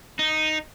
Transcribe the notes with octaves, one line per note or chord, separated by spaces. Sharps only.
D#4